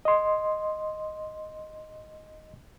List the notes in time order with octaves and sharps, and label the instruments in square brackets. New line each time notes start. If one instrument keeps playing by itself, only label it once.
[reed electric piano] D#5 C6